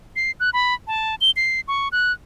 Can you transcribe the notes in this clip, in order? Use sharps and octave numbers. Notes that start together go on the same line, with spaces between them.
C7
F#6
B5
A5
G7
C7
C#6
F#6